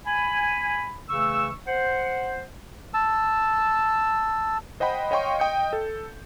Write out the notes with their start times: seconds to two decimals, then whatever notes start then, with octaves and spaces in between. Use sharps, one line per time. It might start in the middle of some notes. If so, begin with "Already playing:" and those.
0.06 G#5 B5
1.09 C#3 E3 A3 C#6 E6
1.67 C5 F#5
2.94 A5 E6
4.80 C5 D#5 F#5 G5 B5
5.11 C#5 D#5 F5 G5 C6 C#6
5.39 D#5 G5 D#6 G6 C#7
5.73 A4